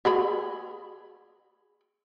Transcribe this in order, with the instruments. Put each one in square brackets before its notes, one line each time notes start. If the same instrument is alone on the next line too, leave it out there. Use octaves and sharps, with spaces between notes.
[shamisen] G4 G#4 B5